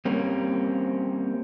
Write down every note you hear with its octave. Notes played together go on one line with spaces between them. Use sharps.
G3 A#3 C4 C#4